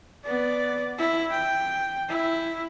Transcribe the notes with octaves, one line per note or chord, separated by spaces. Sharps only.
B3 D5
E4
G5
E4